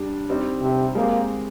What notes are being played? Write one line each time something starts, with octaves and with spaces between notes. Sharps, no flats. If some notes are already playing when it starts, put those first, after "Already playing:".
Already playing: G3 D4 G4
G3 C4 D#4 G4
C3
G#3 A#3 C4 G4